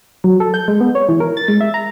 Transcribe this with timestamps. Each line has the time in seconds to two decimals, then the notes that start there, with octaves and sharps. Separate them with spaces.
0.24 F#3
0.40 A4
0.54 G6
0.68 G#3
0.81 B3
0.95 C#5
1.09 E3
1.20 A#4
1.37 A6
1.48 G#3
1.61 E5
1.74 A#5